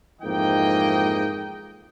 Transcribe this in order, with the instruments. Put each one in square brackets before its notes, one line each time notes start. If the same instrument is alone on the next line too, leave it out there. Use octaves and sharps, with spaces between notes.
[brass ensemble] F2 G#2 E3 A#3 D#5 G5